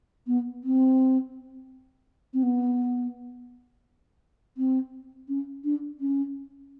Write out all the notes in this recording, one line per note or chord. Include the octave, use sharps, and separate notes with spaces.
B3
C4
C4
B3
C4
C#4
D4
C#4